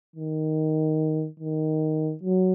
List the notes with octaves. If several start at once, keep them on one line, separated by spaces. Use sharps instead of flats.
D#3
D#3
F#3